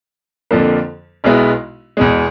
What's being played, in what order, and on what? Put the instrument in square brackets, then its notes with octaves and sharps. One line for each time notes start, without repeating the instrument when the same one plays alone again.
[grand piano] F2 D3 F3 A#3
B1 B2 G#3 B3 E4
E2 B2 G#3